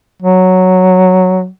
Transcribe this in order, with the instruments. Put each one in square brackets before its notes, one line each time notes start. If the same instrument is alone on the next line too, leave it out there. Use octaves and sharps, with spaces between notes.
[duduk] F#3